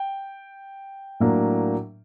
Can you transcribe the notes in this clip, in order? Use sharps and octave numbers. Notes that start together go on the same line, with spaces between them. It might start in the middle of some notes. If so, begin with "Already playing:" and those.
Already playing: G5
A2 F#3 A#3 D4